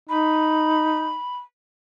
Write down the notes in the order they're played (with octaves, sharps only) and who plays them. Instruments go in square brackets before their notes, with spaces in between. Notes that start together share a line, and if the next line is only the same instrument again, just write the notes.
[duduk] D#4 [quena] B5